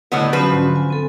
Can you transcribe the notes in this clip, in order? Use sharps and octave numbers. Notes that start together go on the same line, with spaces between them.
A2 D3 F#3 B3 D#5
F3 F#3 C#4 F#4 B4
G#2
G#5
C4 A4